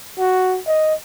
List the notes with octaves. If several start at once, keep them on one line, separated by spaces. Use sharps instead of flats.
F#4
D#5